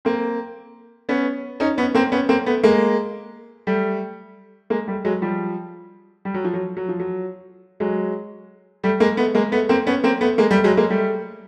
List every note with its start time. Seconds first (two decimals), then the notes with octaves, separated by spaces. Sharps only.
0.05 A#3 C4
1.09 B3 C#4
1.60 C#4 D#4
1.78 B3 C#4
1.95 A#3 C4
2.12 B3 C#4
2.29 A#3 C4
2.46 A3 B3
2.63 G#3 A#3
3.67 G3 A3
4.70 G#3 A#3
4.87 G3 A3
5.05 F#3 G#3
5.22 F3 G3
6.25 G3
6.34 F#3
6.44 F3
6.54 F#3
6.77 F#3
6.89 F3
7.00 F#3
7.80 F#3 G#3
8.83 G3 A3
9.00 G#3 A#3
9.17 A3 B3
9.35 G#3 A#3
9.52 A3 B3
9.69 A#3 C4
9.87 B3 C#4
10.04 A#3 C4
10.21 A3 B3
10.38 G#3 A#3
10.51 G3 A3
10.64 F#3 G#3
10.77 G#3 A#3
10.90 G3 A3